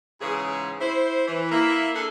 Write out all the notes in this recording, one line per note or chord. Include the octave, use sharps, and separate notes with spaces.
G#2 C#3 E3 G#4
E4 C5
E3
A#3 E4
D4 G#4 A4